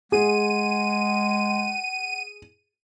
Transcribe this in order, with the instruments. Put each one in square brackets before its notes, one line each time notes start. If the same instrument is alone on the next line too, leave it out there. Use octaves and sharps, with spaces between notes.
[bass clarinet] G#3 [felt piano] G#4 [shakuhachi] F#5 [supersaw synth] D#7